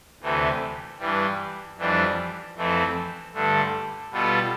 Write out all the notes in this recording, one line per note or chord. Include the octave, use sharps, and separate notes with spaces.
D2 C3 E3 A3
G2 E3 G3
F2 E3 G3 D4
F2 E3 A3 C4
G2 D3 A3
B2 G3 B3 F4 A4